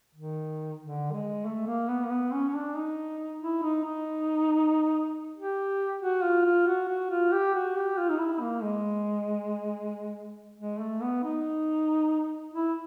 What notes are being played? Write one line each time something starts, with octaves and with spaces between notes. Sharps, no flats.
D#3
D3
G#3
A3
A#3
B3
A#3
B3
C#4
C#4
D4
D#4
E4
D#4
D#4
G4
F#4
F4
F4
F#4
F#4
F4
G4
F#4
G4
F4
D#4
E4
A#3
G#3
G#3
A3
B3
D#4
E4